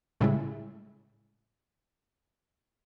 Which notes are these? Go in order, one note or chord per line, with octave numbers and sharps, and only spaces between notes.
A2 C#3 G3 G#3 E4